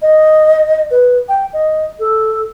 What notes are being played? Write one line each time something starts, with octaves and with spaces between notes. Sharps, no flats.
D#5
B4
G5
D#5
A4